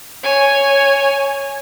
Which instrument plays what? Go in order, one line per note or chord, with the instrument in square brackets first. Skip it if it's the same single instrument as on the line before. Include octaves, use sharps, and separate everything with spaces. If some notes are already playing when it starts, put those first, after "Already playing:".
[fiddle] C#5 G#5